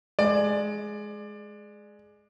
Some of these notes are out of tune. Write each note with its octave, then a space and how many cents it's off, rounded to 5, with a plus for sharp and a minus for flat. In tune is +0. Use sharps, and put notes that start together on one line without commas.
G#3 +10 D5 +25